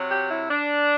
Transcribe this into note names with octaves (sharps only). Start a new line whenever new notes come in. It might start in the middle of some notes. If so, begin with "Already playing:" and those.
Already playing: C3 F#3
G4
E4
D4